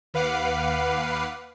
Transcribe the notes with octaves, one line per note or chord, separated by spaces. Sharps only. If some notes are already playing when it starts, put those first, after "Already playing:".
D#2 B4 F5 F#5 D6 C7